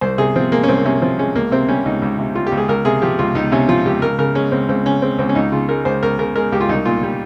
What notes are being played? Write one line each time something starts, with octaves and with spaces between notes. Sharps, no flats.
C2 C5
C3 G#4
F3 C4
G#3 A#3
C#4
C2 C4
C3 C#4
F3 C4
G#3 C#4
C#2 A#3
C3 C4
G3 C#4
C#2 D#4
C#2
C3
G3 F4
G4
C#2
G#4
C#2 A#4
C3 G#4
F3 G4
C#2 F4
C#2 D#4
C3 C#4
F3 F4
C#2 G4
C#2 A#4
C#3 A#4
G#3 C#4
C#2 C4
C#2 C4
C#3 C#4
G#3 C4
C#2 C4
C#4
C#2 D#4
C#3 F4
G#3 A#4
C#2 C5
C#2 A#4
C#3 A#4
G#3 A#4
C#2 G4
F4
C2 D#4
A#2 F4
G3